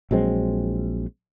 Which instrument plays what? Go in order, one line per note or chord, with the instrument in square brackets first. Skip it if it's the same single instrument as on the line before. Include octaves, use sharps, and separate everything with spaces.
[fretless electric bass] A#1 F#3 G#3 C4